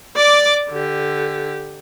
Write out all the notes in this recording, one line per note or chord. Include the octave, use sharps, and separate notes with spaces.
D5 D6
D3 G4